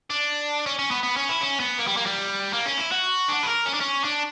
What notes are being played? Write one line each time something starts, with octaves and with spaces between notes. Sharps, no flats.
D4
C#4
C#4
B3
B3
C#4
E4
C#4
B3
A#3
G3
A#3
G3
A#3
C#4
E4
F#4
D4
B4
A#4
C#4
D4
C#4
D4